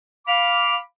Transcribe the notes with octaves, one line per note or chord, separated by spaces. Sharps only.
F5 B5 D6 F7